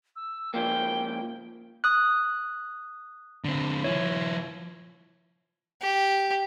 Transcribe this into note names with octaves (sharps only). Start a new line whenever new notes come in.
E6
C#2 F3 A#3 G5
D#6 F#6
D3 C4
F3 E4 C#5
G4